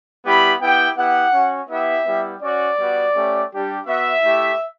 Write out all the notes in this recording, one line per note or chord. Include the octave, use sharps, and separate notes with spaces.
G3 B3 E4 G4 B5
B3 E4 G4 G5
B3 E4 G4 F#5
C#4 F#4
B3 E4 G4 E5
G3 B3 E4 G4
C#4 F#4 D5
G3 B3 F#4
A3 C#4 G4
G3 D4 G4
B3 F#4 E5
A3 E4 G4